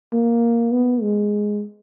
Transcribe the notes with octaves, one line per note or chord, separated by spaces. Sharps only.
A#3
B3
G#3